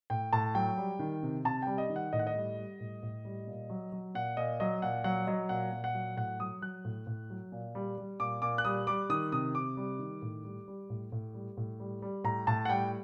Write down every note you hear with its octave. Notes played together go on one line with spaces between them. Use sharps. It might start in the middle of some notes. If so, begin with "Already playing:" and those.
A2 G5
A2 A5
F#3 G5
G3
D#3
C3
C3 A5
G3 G5
D#5
D#3
F#5
A2 D#5
F#5
D#5
G3
G3
A2
A2
G3
A#2
F#3
F#3
A#2 F#5
A#2 D#5
F#3 D#5
A#2 F#5
F#3 F#5
F#3 D#5
A#2 F#5
A#2
F#5
F#3
A2 F#5
F#3 D#6
F#3 F#6
A2
A2
F#3
A#2
G3
G3
A#2 D6
A#2 D6
F#6
G3 D#6
G3 D6
D#3 D#6
C3 D#6
C3 D6
G3
D#3
A2
G3
G3
A2
A2
G3
A2
G3
G3
A2 A#5
A2 A5
F#5
G3 G5